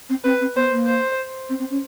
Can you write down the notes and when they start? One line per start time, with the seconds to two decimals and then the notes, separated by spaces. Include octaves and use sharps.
0.09 C4
0.24 C4 B4
0.41 C4
0.56 B3 C5
0.71 A#3
0.87 C5
1.49 C4
1.59 C4
1.70 C#4